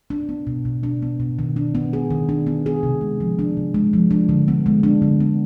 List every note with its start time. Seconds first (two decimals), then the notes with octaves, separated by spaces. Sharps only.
0.10 D4
0.29 B3
0.47 B2
0.65 B2
0.83 D4
1.02 B3
1.20 B2
1.39 D#3
1.56 D4
1.75 B3
1.93 G#4
2.10 D#3
2.29 D4
2.47 B3
2.66 G#4
2.83 C3
3.01 G#3
3.20 F3
3.39 D4
3.57 C3
3.74 G#3
3.93 F3
4.11 D4
4.29 D3
4.48 B3
4.66 G#3
4.83 D4
5.02 D3
5.20 B3